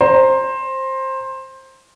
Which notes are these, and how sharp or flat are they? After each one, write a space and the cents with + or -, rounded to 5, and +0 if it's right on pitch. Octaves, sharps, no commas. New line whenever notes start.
C5 +15 A#5 +0